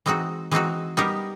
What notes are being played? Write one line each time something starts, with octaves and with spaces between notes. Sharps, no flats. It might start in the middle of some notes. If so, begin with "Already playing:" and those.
E3 G#3 C4 D#4 F#4
E3 G#3 C4 D#4 F#4
G3 B3 D#4 G4 A#4